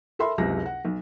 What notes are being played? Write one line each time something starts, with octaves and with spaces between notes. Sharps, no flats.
A4 A#4 E5 B5 C6
F#1 C#2 C3 A#6
F#5
B1